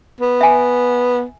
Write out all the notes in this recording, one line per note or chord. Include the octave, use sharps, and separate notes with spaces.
B3
E5 G#5